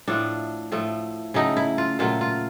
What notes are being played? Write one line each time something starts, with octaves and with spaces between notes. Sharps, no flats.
A2 F3 A3 D4
A2 F3 A3
C#3 F#3 A3 D#4
E4
F4
A#2 F#3 A3 F4
F4